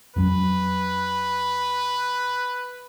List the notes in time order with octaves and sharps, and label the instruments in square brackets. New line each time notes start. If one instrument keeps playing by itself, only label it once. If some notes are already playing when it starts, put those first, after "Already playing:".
[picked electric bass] F2 F#3 C#4 [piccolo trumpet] B4